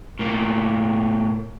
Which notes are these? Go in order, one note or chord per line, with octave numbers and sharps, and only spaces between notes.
A2 A#3